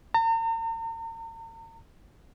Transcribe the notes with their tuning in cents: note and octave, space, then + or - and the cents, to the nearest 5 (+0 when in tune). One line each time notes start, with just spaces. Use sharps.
A#5 -45